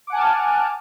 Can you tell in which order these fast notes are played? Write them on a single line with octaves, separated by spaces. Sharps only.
D6 F#5 G#5 A5 F6